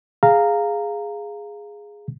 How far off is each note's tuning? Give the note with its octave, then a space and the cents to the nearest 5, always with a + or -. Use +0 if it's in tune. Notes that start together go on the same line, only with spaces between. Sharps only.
G#4 +0 F5 +0 A#5 -15